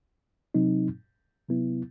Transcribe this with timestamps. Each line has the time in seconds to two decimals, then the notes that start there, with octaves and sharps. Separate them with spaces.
0.54 C3 F#3 C4 D#4
1.49 C3 F#3 B3 E4